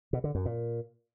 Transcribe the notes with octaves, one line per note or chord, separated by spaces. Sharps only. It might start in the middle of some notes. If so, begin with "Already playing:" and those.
B2
D3
F#2
A#2